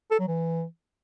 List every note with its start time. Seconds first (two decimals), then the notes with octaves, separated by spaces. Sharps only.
0.11 A4
0.19 F#3
0.28 E3